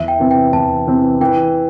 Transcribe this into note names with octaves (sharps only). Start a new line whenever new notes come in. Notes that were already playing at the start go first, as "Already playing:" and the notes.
Already playing: E2 E5
G5
C3 E3 C4
G5
E2 A5
C3 E3 C4
E3 G5